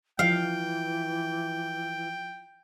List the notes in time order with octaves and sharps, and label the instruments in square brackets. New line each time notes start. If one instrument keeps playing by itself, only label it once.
[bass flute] E3 [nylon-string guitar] F3 [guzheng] F5 [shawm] G5